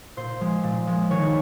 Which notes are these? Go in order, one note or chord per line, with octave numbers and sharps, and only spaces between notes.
A#2 C5
F3 G#3
A#2
F3 G#3
D#3 C#5